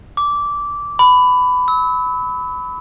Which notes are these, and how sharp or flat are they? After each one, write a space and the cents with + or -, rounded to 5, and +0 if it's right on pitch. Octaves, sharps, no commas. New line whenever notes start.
D6 -15
B5 +20
E6 -30